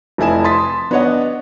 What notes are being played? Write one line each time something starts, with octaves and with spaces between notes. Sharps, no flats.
F1 F2 E4 G#5 E7
C6 D#6 A6 B6
B3 D4 C#5 D#5 F#5